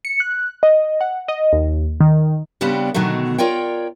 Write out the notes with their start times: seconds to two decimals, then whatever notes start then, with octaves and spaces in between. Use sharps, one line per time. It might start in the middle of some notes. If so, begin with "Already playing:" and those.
0.05 C#7
0.20 F#6
0.63 D#5
1.01 F#5
1.28 D#5
1.53 D#2
2.01 D#3
2.61 C#3 G3 B3 C4 D4 G4
2.94 B2 D3 D#3 F#3 A3
3.38 F4 A#4 C#5 D5 G5